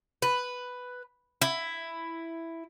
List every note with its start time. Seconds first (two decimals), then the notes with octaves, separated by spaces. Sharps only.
0.22 B4
1.42 E4